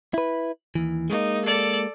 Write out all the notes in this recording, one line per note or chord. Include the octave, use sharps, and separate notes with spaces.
E4 B4
D#2 E3
G#3 A#3 D#4
A4 D5